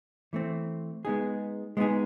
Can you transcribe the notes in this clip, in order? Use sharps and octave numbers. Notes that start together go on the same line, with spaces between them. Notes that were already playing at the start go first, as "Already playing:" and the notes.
E3 A3 C4
G#3 B3 D#4 G#4
G#3 B3 D#4 G#4